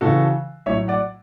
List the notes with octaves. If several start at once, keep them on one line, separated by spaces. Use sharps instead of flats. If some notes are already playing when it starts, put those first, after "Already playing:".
C#3 E3 F#4 A4
A2 F#3 C#5 E5
D5 F#5